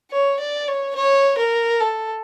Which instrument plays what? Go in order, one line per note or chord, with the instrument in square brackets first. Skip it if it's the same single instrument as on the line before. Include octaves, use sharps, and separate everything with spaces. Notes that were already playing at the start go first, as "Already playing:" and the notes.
[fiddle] C#5
D5
C#5
C#5
A#4
A4